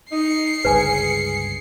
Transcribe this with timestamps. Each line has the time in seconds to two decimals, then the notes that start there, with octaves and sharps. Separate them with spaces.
0.11 D#4 C7 C#7
0.65 G1 C#2 G2 G#4 B4 G#5